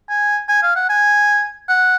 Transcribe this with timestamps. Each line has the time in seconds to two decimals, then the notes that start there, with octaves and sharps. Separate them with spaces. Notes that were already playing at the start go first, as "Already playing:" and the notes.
0.09 G#5
0.49 G#5
0.63 F5
0.76 F#5
0.89 G#5
1.69 F#5